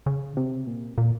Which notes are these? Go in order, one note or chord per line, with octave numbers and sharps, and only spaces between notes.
C#3
C3
A#2
A#2